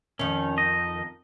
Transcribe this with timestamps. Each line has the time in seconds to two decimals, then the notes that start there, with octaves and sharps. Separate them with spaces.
0.19 F2 D#3 C#4
0.58 D#5